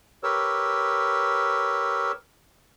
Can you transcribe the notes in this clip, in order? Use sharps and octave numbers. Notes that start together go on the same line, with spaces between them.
G4 A#4 B4 C#5 E6